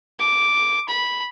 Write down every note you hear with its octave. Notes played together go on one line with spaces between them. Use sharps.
D6
B5